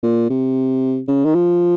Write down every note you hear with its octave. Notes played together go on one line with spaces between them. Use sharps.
A#2
C3
C#3
D#3
F3